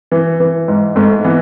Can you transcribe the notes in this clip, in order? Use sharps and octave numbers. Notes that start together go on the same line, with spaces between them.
E3
E3
G#2
G#2 A3
E3 B3